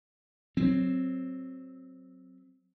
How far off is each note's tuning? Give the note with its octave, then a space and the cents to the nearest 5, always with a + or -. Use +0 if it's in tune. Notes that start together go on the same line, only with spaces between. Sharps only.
F#3 +0 C4 +0